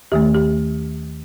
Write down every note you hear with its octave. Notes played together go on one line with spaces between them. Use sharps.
D#2 D#3 A3 G4
G4